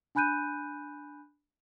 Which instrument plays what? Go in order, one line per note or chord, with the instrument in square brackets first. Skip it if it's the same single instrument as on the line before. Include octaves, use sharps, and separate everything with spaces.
[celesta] D4 G#5 B5 F#6 G6 D#7